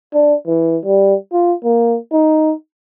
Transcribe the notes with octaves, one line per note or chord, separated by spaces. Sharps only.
D4
E3
G3
F4
A#3
D#4